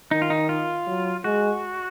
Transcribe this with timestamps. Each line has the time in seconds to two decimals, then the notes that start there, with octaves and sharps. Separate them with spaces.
0.11 D#3 D#4
0.22 F4
0.30 D#4
0.49 F4
0.87 F#3
1.24 G#3 F#4